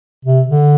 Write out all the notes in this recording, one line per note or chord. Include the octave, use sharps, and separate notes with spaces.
C3
D3